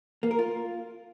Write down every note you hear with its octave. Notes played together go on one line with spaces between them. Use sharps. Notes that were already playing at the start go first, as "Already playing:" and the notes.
A#3
A#4
F4